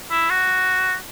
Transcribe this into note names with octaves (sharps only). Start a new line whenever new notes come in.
E4
F#4